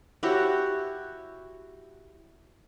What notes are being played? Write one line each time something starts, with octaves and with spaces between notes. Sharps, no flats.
E4 F#4 G4 C#5